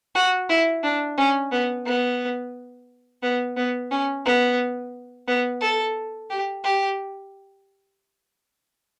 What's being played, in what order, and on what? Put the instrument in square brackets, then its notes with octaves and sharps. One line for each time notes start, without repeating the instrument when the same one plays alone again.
[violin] F#4
E4
D4
C#4
B3
B3
B3
B3
C#4
B3
B3
A4
G4
G4